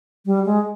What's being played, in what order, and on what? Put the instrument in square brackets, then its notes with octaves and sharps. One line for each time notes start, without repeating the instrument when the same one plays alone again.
[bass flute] G3
G#3